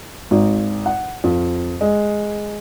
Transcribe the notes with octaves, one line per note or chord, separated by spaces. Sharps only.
G#1
F#5
F2
G#3